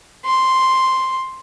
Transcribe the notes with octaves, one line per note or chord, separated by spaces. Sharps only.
C6